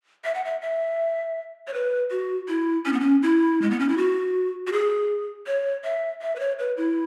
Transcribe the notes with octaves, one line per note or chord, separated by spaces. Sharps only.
E5
F#5
E5
E5
C#5
B4
F#4
E4
C#4
B3
C#4
E4
G#3
B3
C#4
E4
F#4
F#4
G#4
C#5
E5
E5
B4
C#5
B4
E4